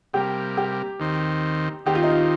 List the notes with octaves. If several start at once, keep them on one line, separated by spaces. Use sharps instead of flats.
C3 G3 A#3 G4
G4
D#2 D#3 C4
D#2 D#3 C4 G4
F4
D#4
F4